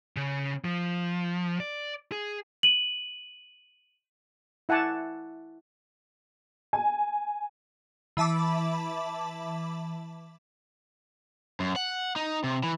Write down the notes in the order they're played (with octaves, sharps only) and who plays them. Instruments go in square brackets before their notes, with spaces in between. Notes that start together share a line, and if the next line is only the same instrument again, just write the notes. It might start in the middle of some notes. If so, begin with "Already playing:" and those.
[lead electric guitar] C#3
F3
D5
G#4
[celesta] D#7 F#7
[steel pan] E4 F#5 G#5 A5 D6
[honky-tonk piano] G#5
[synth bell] E3 E5 A5 B5 D6
[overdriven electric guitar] F#2
F#5
D#4
C3
E3